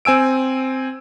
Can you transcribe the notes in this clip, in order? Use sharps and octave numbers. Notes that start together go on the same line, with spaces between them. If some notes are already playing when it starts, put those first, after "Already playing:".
C4 G#5 E6 D7